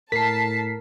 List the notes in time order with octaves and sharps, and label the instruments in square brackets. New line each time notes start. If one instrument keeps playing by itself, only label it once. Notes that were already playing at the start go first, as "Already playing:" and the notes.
[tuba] A2 [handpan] A#4 [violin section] A5 [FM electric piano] B6 C7